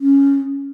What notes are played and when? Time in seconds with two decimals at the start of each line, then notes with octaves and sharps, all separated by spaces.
0.01 C#4